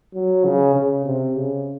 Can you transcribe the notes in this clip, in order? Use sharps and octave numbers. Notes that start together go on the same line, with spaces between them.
F#3
C#3
C#3
C3
C#3